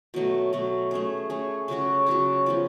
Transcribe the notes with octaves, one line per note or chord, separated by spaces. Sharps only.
B2 F#3 A3
B2 F#3 A3
A3 C#4 G#4
A3 C#4 G#4
C#3 F#3 C#4 F#4
C#3 F#3 C#4 F#4
F3 B3 F4 B4